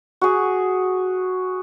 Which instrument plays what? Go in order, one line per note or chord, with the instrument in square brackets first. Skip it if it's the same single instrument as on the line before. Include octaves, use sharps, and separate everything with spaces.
[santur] F#4 G#4